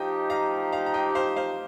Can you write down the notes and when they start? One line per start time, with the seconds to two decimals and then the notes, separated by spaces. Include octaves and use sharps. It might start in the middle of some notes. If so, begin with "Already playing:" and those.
Already playing: F3 D#4 G4 D#5 G5
0.30 F5 A#5
0.72 F5 A#5
0.86 A#5
0.94 D#5 G5
1.15 C5 F5
1.36 C5 F5